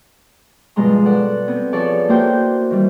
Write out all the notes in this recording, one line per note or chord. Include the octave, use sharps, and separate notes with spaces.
G2 B2 F3 G#3 A#5 C6
A4 D5 F#5
B3 C4
F3 G#4 A4 C#5 D5 A5
A#3 E4 F#4 C5 G5
D#3 E3 G3